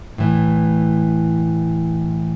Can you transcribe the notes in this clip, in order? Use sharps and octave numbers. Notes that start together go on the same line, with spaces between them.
A2 E3